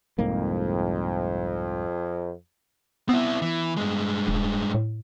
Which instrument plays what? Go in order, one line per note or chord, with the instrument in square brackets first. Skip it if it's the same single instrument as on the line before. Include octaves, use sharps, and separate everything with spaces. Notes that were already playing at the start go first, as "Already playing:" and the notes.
[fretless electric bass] C2 G#2 A#3 [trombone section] F2
[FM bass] B3 [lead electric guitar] C4 E4
[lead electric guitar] E3
G2 G#3
[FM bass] D#1
A2